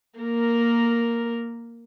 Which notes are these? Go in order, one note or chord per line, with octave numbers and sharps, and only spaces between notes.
A#3 A#4